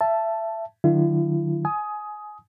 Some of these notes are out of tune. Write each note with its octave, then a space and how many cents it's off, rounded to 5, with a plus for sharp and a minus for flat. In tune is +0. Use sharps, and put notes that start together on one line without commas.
E5 +20 A5 +0
D3 +45 F#3 -10 E4 +45
G#5 +20 D#6 +10